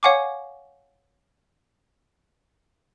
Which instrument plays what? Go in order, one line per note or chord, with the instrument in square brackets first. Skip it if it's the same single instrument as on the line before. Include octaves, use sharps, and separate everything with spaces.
[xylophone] C#5 F5 F#5 G#5 C#6 D6